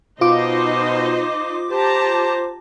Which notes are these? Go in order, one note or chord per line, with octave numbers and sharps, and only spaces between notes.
B2 D#4 F4 C5 D#5 D6
G4 C5 A5 A#5